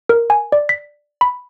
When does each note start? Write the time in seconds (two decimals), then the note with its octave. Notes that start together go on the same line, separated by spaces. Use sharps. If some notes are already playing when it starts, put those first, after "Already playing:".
0.09 A#4
0.30 G#5
0.52 D5
0.69 B6
1.21 B5